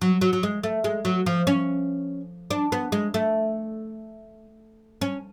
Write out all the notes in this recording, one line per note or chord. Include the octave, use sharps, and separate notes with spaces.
F#3
F#3
F#3
G#3
A3
G#3
F#3
F3
C#4
D4
B3
G#3
A3
C#4